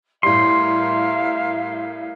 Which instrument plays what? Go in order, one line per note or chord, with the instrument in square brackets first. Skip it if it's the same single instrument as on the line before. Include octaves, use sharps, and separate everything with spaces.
[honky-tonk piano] A2 G3 [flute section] A#4 E5 F5 [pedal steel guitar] C6